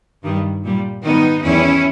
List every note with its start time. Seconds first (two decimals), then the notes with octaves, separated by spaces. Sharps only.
0.23 G2 D#3 G3
0.63 A#2 G3
1.03 G#2 D#3 G3 B3 D#4
1.44 E2 D#3 G3 C#4 E4